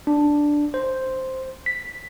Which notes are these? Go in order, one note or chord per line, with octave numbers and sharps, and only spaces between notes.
D4
C5
B6